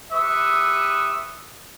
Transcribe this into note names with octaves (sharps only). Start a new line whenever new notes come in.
G4 B4 E5 C#6 D#6